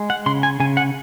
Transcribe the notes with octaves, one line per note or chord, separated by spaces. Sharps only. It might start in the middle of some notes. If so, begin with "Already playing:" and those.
Already playing: G#3
F#5
C#3 C6
G#5
C#3 G#5
F#5